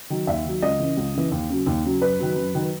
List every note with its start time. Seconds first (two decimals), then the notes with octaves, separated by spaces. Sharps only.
0.10 D#3 F#3
0.27 D#2 E5
0.45 D#3 F#3
0.62 C#2 D#5
0.80 C#3 E3
0.97 C#2
1.14 C#3 E3
1.31 D#2
1.49 C#3 F#3
1.66 D#2
1.84 C#3 F#3
2.01 F#2 B4
2.19 D#3 F#3
2.36 F#2
2.53 D#3 F#3